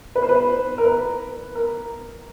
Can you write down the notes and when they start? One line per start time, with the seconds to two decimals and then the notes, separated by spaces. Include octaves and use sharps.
0.15 B4
0.22 C5
0.29 B4
0.78 A#4
0.85 B4
1.55 A#4